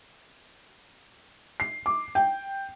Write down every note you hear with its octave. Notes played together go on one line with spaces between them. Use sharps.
C7
D6
G5